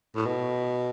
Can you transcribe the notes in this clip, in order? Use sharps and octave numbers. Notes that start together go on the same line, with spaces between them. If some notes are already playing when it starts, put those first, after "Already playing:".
A2
B2